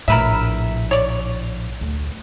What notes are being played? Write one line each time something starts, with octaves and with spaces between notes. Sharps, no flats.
A#1 A2 A#4 B4 E5
C#5 D5
D2